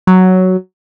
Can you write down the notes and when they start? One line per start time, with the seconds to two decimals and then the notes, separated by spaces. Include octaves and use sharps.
0.07 F#3